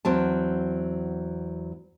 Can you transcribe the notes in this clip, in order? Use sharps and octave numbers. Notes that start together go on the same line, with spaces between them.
E2 F#3 C4 A5